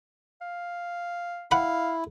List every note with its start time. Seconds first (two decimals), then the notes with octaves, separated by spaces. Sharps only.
0.41 F5
1.51 E4 F5 F#5 B5